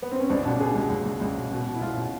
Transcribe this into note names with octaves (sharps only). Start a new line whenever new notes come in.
B3
C4
C#4
C#2 D4
B2 D4
B2 G#4
C#2
C#2
C#2
C#2
B2
B2
B2
E4
C#2 F4
B2